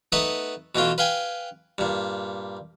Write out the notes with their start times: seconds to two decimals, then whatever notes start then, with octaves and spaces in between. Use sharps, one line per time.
0.12 A3 B3 D#4 B4 F#5 D#6
0.75 B2 E3 A3 F4
0.98 B4 F5 G5 G#5
1.78 G2 A#2